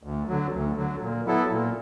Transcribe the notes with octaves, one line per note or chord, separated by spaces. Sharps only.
D2
D3 F#3
D2
D3 F#3
A#2
F#3 B3 E4 A4
A#2